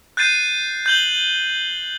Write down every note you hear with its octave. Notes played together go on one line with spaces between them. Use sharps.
F#6 G6 A6 C7 D#7
G6 F#7 G7